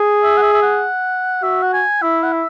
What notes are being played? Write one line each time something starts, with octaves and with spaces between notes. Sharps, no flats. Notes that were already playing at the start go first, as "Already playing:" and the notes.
Already playing: G#4
E5
F#5
E5
E5
F#5
F#4 E5
F#5
G#5
E4 E5
F#5
E5